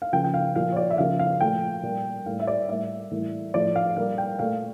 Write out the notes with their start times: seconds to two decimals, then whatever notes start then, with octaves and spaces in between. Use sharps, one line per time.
0.02 F5
0.12 C#3 F3 A#3 G5
0.24 G5
0.34 F5
0.56 A#2 F3 A#3 F5
0.72 C#5
0.76 D5
0.91 E5
0.98 C#3 F3 A#3 F5
1.19 F5
1.40 A#2 F3 A3 G5
1.83 A#2 G3 A#3
2.26 A2 G3 A#3 F5
2.40 E5
2.47 D5
2.69 A2 G3 A#3 E5
3.11 A2 E3 G3 A#3
3.54 A2 F3 A3 D5
3.76 F5
3.96 A#2 G3 A#3 F5
4.18 G5
4.39 A#2 A3 F5